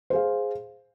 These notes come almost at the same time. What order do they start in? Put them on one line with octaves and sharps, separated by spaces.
C5 G#4 F5